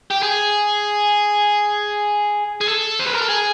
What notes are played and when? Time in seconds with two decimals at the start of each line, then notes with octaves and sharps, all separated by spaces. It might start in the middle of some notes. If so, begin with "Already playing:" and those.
0.11 G4
0.23 G#4
2.61 G#4
2.68 A4
2.99 C5
3.07 B4
3.15 A#4
3.22 A4
3.29 G#4